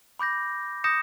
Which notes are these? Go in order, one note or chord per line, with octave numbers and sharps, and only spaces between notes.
B5 D6 G6 A#6
D#6 G6 A#6 C#7 E7